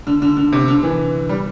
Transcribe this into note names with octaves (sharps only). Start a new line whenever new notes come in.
D3
D3
D3
C3
D3
E3
G3